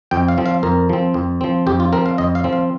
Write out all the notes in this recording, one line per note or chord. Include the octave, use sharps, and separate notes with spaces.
F2 G5
F5
F3 C4
F5
F2 A#4
F3 C4
F2
F3 C4
F2 G4
F4
F3 C4 A#4
F5
F2 D#5
F5
F3 C4
F5